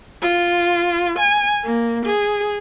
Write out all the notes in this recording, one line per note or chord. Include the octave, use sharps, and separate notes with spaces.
F4
G#5
A#3
G#4